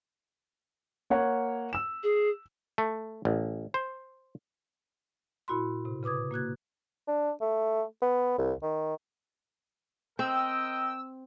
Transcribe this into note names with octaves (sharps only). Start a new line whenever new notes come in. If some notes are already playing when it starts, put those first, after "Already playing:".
A#3 C#5 F#5
E6 E7
G#4
A3
A1
C5
A#2 E4 F#4 B5 C6
A2 C3
C#3 B4 D6 D#6 G#6
A#3 F#4 F#6 G#6
D4
A3
B3
C2
D#3
C4 A#4 D#5 G5 E6